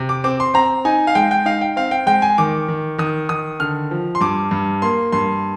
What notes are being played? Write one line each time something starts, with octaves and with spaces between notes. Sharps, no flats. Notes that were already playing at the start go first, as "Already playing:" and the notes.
Already playing: C3
D6
C4 D6
C6
C4 A#5
D#4 G#5
F5
G#3 G5
G5
D#4 F5
G5
C4 F5
G5
G#3 G5
G#5
D#3 D6
D#3
D#3 D#6
D#3 D#6
D3 F6
F3
C6
G2 D6
G2
A#3 C6
G2 C6